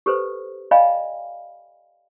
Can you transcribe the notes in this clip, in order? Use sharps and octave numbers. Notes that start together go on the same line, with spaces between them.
G4 A4 B4 C5
D5 D#5 F5 G5 G#5 B5